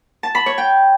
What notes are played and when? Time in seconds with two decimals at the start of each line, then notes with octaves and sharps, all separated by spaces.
0.23 A5
0.35 B5
0.46 C#5
0.58 G5